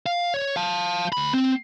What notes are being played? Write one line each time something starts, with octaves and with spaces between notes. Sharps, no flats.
F5
C#5
F5 A5
D2 B5
C4